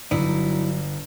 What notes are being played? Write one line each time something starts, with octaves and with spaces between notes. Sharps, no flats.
G1 D3 F#3 D#4 E4 D5